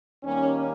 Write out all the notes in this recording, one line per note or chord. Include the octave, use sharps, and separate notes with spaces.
D#2 D#3 G3 A#3 C#4